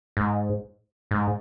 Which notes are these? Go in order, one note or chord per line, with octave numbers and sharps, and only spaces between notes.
G#2
G#2